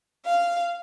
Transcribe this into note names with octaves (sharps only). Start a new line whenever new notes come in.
F5